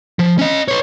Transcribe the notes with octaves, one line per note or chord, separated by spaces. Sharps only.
F3
C#4 D#5
B4 C#5